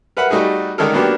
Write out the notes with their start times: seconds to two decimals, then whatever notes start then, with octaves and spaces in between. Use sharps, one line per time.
0.17 A#4 B4 E5 F#5 B5
0.30 G3 A3 D#4 F#4 G#4
0.78 D3 D#3 G#3 C#4 A4 A#4
0.93 F#3 A#3 B3 D4 G4